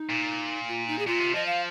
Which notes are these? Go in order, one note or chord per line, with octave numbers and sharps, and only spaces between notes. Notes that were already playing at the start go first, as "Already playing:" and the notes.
Already playing: D#4
A#2
F4
D#4
G#4
A#2 F4
C3
F3 D#5
F5